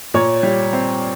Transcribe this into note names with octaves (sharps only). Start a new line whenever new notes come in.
A#2 C#5
G3
C4